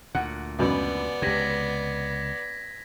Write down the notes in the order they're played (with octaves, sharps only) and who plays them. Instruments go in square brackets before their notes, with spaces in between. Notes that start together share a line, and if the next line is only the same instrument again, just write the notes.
[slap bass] D2 A#2 [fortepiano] F#5
[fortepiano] C#2 F#2 B2 [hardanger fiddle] B3 D5
[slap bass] C#2 C3 [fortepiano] G4 [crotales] G#6 A#6 B6